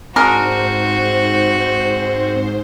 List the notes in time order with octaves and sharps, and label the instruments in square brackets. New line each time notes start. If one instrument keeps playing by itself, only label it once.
[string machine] G#2 C5 [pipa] G#3 D4 A#4 [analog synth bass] C4 [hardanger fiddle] F#4